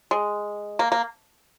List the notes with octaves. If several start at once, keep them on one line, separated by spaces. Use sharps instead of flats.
G#3
A#3
A#3